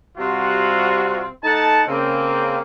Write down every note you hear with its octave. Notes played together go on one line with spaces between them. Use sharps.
C3 G3 C4 F4 F#4
A3 D#4 F#5 A5
C#3 A#3 C4